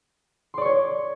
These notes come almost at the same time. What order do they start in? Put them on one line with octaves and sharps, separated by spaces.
C6 D5 C#6 C#5